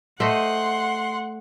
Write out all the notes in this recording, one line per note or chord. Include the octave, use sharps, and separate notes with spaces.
A3 C5 D#5 F#5 C6